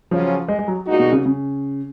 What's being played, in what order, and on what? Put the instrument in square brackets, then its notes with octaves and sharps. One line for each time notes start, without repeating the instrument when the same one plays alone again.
[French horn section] C#3 F#3 C#4 F4 [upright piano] F3
[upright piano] G#3
G#3
F#3
[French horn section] A#2 G#3 D#4 F#4
[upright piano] B2
C#3
C#3